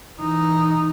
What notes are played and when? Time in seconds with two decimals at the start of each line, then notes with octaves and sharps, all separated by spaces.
0.19 E3 D#4